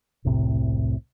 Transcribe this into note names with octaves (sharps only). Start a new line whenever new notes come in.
E1 C2 A2 C3